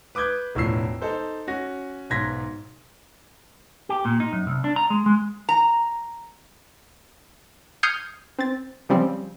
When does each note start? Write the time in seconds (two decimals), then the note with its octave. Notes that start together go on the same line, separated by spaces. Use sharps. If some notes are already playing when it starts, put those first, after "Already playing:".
0.15 B4 D6 D#6 G6 G#6
0.55 E1 A2 F3 E6 C7
1.02 D#4 A4 C5
1.47 C#4 F#4 A#6
2.10 B1 G#2 C6 G#6 A#6 B6
3.89 G4
4.05 A#2
4.20 D#4
4.33 F#2
4.47 C2
4.64 D4
4.76 A#5
4.90 G#3
5.06 G#3
5.49 A#5
7.83 D#6 F6 G6 G#6 C7 C#7
8.39 C4 A6
8.89 C#3 F3 G3 C4